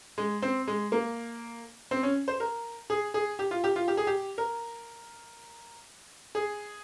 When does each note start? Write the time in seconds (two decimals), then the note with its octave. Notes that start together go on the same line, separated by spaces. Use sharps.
0.18 G#3
0.42 C4
0.67 G#3
0.92 A#3
1.91 C4
2.03 C#4
2.28 C5
2.40 A#4
2.90 G#4
3.14 G#4
3.39 G4
3.51 F4
3.64 G4
3.76 F4
3.88 G4
3.97 G#4
4.07 G4
4.38 A#4
6.35 G#4